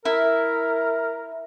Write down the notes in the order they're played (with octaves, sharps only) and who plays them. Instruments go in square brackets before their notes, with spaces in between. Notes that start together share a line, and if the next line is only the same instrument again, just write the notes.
[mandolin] E4 [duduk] A#4